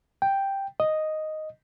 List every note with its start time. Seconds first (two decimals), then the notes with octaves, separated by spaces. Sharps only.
0.22 G5
0.80 D#5